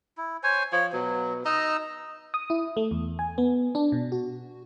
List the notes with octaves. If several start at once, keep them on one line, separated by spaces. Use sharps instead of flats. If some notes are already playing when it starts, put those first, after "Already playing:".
E4
C5 C#5 G#5
F3 C#5
B2 F#3
D#4 D#5 A#5 E6
D#6
E4
A3
E2
G#5
B3
D4
B2
F#4